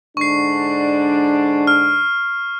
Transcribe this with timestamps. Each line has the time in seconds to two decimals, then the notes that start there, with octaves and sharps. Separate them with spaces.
0.17 G#2 D3 D4 C#6 C7
1.67 F6